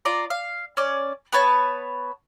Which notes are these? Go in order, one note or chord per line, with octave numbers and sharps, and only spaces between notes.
F4 D5 A#5
F5
C#4 D5
B3 B4 C#5 A5